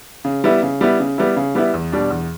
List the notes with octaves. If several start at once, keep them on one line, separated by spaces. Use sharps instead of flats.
C#3
G3 B3 E4
C#3
G3 B3 E4
C#3
G3 B3 E4
C#3
G3 B3 E4
E2
B2 G3 D4
E2